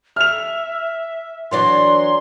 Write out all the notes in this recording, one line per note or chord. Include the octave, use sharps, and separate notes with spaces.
E5 F6 F7
E3 F#3 D4 C6